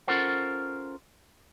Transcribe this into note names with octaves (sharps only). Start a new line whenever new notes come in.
C#4 F4 A4 A#4 C5 F#5